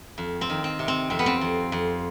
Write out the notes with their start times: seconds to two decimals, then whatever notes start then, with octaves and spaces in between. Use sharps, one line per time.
0.18 F2
0.41 C4
0.50 D#3
0.64 C4
0.79 C3
0.88 C4
1.10 F2 C4
1.19 B3
1.26 C4
1.41 F2
1.72 F2